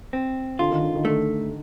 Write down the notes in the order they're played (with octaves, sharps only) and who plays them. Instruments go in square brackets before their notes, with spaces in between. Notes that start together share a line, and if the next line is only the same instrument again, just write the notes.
[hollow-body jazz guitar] C4
[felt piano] D3 [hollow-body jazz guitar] F4
[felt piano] D#3
D3
D#3
[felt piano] D3 [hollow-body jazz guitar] A3